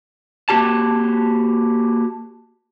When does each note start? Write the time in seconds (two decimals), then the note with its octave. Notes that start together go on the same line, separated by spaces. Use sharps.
0.49 A#3 F#4 G4 A5